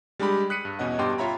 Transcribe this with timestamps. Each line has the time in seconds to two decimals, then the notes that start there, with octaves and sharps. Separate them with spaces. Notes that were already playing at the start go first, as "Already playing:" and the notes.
0.19 G3 G#3 D4 G4 B5
0.50 D#6 F#6 B6 C#7 D#7
0.65 G2
0.79 E2 B2 C#4 D#5 F#5
0.99 G2 B2 G4 G5 C6 D6
1.18 F4 C#5 E5 A#5 B5